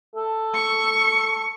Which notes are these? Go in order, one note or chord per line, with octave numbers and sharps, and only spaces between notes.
A4
C#6